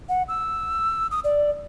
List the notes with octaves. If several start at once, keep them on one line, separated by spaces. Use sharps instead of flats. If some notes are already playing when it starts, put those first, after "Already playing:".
F#5
E6
D#6
D5